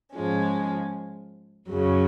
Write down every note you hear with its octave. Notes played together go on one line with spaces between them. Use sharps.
G#2 F3 G#3 C#4
F#2 C#3 F#3